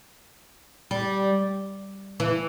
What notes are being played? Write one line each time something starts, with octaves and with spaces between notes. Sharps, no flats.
G3
E3